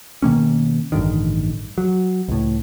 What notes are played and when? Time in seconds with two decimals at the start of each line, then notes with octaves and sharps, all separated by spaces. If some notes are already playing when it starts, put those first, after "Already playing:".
0.22 B2 D#3 A#3 C#4
0.92 A1 G2 D3 D#3
1.78 F#3
2.28 C#2 A2